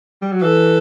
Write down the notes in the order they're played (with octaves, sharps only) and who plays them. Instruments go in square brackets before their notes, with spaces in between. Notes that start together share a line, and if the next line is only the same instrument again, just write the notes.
[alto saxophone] G3
F#3
[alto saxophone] E3 [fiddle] A4